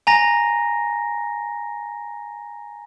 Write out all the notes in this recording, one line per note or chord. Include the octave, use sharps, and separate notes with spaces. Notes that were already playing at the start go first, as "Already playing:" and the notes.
G#5 A#5 A#6